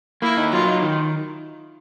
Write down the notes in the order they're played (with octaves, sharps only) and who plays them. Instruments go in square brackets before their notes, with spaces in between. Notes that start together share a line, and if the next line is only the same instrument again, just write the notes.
[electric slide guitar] A#3 [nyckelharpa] E4
[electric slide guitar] D#4
[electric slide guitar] F#3 [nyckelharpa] F4
[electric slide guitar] D#4
D#3